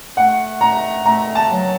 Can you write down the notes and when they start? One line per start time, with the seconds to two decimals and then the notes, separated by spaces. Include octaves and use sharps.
0.17 A3 F#5
0.61 A3 A#5
1.05 A3 A#5
1.35 A5
1.51 F#3